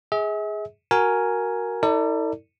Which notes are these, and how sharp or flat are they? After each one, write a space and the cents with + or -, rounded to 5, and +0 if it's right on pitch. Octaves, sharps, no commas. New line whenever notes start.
G#4 +0 E5 -45
F#4 +0 A#4 +0 G#5 +5
E4 -45 A4 +40 D5 +0